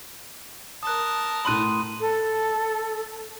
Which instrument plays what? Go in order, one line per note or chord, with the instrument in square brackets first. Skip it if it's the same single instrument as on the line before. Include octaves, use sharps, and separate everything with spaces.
[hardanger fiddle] A#4 A5 [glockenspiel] D#6 F#6
[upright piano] A2 F#6 F#7 [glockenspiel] B5 C6 D#7
[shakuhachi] A4